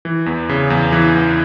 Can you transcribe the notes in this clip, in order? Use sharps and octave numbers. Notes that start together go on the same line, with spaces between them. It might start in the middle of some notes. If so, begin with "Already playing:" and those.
E3
E2
C#3
E2
E3
E2